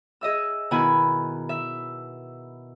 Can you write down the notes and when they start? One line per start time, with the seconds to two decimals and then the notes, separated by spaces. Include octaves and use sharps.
0.21 G#4 D#5 E5 E6
0.71 B2 D#3 E4 G#5 B5 F#6
1.49 E5